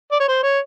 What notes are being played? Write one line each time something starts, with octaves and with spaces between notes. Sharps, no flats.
D5
C#5
C5
C#5